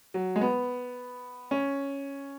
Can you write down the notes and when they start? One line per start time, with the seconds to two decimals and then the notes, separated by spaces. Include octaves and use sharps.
0.14 F#3
0.36 G#3
0.41 B3
1.51 C#4